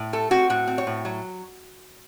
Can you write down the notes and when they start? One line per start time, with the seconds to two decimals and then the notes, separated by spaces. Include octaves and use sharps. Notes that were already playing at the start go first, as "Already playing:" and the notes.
Already playing: A2
0.13 A3 A4
0.31 C4 F#4
0.50 A2 F#4
0.68 C4
0.78 C#5
0.87 A2
1.05 F#3